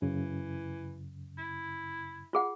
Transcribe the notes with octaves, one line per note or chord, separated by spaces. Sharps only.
F#2 C#3 E3
E4
F4 G#4 F#5